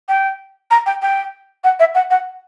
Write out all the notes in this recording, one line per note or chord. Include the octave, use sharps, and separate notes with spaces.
G5
A#5
G5
G5
F#5
E5
F#5
F#5